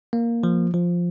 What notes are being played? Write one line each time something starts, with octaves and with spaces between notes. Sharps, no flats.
A#3
F3
F3